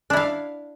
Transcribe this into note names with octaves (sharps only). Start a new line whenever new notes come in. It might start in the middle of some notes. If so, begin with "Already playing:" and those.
D4 E4 F5